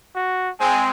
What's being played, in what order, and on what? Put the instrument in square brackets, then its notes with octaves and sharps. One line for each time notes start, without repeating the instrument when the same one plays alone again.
[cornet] F#4
[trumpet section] G#3 C4 [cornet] G#5